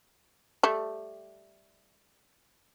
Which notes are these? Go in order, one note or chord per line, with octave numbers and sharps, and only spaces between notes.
G3 A3